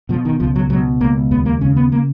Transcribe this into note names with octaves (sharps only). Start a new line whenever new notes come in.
B2 F3
D#3
C#2 F3
F#3
B2 F#3
C#2 A#3
D#2 B3
A#3
C#3 C#4
B3
A#3